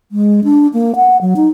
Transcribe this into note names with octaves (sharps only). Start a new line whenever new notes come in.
G#3
D4
A#3
F#5
F#3
D#4